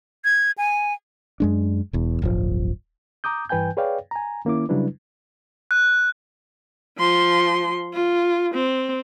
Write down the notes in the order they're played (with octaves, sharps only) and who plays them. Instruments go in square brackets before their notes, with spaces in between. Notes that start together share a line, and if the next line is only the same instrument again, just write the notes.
[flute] G#6
G#5
[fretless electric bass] F#2 G#3 D4
E1 E2
D1 G1 F3
[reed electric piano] A#5 D6 D#6 G6
G2 E3 B4 G5 G#5 G6
G#4 B4 C#5 D5 F5 G5
G#5 A#5
D#3 A#3 C#4 E4 D6
C#3 F#3 G3 D4 E4 B4
[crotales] F#6
[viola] F3 C6
F4
C4